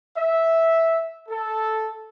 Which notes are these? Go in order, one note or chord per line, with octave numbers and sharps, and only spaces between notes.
E5
A4